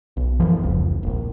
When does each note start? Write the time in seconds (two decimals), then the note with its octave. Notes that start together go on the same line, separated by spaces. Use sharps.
0.17 B1
0.40 F#2 E3 F3
0.63 F1 C#2
1.03 D#1 A#1